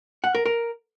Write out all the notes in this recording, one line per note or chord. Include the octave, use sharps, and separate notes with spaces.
F#5
A#4
A#4